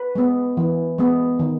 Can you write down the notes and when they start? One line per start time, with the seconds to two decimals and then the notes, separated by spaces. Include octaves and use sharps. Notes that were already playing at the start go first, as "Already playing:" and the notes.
Already playing: B4
0.15 G#3 B3
0.57 E3
0.98 G#3 B3
1.39 D#3